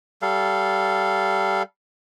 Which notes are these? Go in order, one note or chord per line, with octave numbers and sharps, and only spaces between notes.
G3 A4 F5